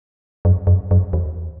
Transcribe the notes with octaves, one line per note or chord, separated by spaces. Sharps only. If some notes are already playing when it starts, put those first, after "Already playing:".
F#2
F#2
F#2
E2